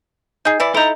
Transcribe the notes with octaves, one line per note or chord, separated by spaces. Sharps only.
D#4 G#4
E3 E4 D5
D#4 E4 A4 A#5